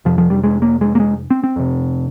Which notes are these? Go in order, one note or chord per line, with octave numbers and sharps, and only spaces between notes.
F2 C3 F3
F3
G3
G#3
A#3
G#3
A#3
G#3
C4
C4
F2 C3